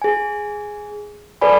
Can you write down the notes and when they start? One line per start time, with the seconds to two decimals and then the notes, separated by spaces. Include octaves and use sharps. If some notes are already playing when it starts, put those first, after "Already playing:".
0.02 G#4 G#5
1.41 A4 B4 D5 G#5 B5